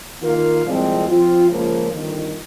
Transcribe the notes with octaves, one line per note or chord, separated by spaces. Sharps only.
D#3 A#3 F4 A#4 F5
C2 A#2 F3 G#3 C4
F3 C4 F4
C#2 C#3 F3 A#3
G1 F2 D#3